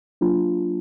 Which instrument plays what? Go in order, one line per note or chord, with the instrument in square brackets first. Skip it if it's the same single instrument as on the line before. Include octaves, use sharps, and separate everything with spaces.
[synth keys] F#3 A#3 D4 F4